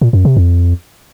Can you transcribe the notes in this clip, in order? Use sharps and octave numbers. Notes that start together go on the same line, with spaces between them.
A#2
F#2
C3
F2